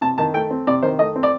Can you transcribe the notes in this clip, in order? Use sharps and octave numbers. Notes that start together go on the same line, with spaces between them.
C3 A5
D#3 A5
A3 G5
C4
C3 D5
D#3 C5
A3 D#5
C4
D5